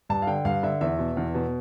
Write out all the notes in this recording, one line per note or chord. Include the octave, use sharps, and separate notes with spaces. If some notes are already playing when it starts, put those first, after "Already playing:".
G2 A5
F5
D3 G5
G2 F5
D3 E5
E2 E5
B2
E2
B2